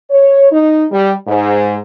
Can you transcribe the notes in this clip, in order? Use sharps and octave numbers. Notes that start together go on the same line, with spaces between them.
C#5
D#4
G3
G#2